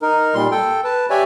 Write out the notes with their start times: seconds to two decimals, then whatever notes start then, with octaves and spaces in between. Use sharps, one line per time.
0.02 D#4 A#4
0.35 A#2 G3 C6
0.51 A4 G5
0.84 B4 A5
1.10 G4 C#5 D5 E5 G#5